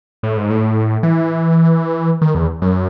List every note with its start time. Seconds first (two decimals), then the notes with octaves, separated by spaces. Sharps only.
0.23 A2
0.37 G#2
0.50 A2
1.03 E3
2.21 D#3
2.35 E2
2.62 F#2